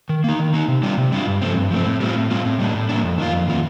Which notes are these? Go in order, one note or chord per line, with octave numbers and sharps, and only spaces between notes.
D#3
A#3 D#4
D#3
A#3 D#4
C3
G3 D4 F4
C3
G3 D4 F4
G2
F3 A3 C4
G2
F3 A3 C4
A2
G3 C4 F4
A2
G3 C4 F4
A2
G3 A#3 D4
A2
G3 A#3 D4
F2
D#3 A#3 F4
F2
D#3 A#3 F4